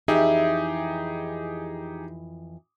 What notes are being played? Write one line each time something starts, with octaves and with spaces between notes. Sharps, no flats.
F2 E3 D#4 G4 G#4 E5